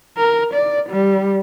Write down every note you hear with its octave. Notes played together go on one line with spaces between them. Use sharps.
A#4
D5
G3